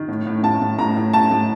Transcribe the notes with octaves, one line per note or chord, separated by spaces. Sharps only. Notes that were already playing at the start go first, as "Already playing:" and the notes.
Already playing: D#3
A2
A2
A2 A5
A2
A2 A#5
A2
A2 A5
A2